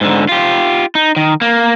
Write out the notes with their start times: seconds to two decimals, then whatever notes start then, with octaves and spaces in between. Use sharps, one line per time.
0.01 G#2 D3
0.29 F4 G4
0.95 D#4
1.16 D#3
1.41 A#3